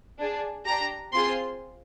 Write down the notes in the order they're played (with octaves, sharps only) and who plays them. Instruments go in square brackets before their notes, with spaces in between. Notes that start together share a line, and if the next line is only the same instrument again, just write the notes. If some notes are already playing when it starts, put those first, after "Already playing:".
[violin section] D4 G#4
D4 G4 A#5
C4 F4 G#4 C6